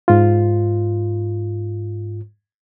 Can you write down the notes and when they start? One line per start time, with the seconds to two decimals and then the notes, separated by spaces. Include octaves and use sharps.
0.08 G#2 F4